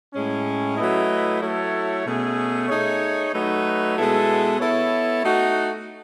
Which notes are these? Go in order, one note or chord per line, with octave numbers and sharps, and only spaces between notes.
A2 G#3 C#4
F#3 A3 E4 B4 D#5
F#3 A3 E4 A4 C#5
B2 A3 C#4 G#4
A3 D#4 G#4 C#5
F#3 A3 D#4 F#4 B4
B2 G#3 B3 E4 A4
B3 E4 A4 C#5
A3 D#4 F#4